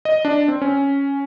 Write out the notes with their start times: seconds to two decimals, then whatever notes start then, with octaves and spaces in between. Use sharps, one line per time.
0.05 D#5
0.25 D4
0.48 C4
0.62 C#4